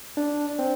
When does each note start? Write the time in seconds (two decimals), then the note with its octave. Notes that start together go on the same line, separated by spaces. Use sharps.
0.17 D4
0.59 C4